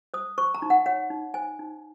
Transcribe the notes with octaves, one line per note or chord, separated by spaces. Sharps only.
C5 D#6
C5 C#6
A#5
D#4
F#5
C#5 F#5
D#4
C5 G#5
D#4